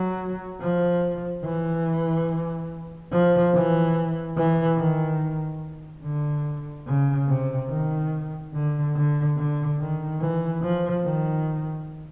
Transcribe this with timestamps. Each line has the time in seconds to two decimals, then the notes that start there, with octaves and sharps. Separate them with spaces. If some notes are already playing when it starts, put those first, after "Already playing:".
Already playing: F#3
0.61 F3
1.44 E3
3.12 F3
3.53 E3
4.37 E3
4.78 D#3
6.03 D3
6.87 C#3
7.28 C3
7.70 D#3
8.54 D3
8.95 D3
9.37 D3
9.79 D#3
10.20 E3
10.62 F3
11.04 D#3